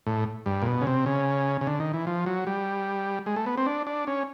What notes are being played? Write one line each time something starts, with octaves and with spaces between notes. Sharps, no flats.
A2
G2
A#2
B2
C#3
C3
C#3
C#3
D3
D#3
E3
F3
F#3
G3
G#3
A3
B3
C4
D4
D4
C#4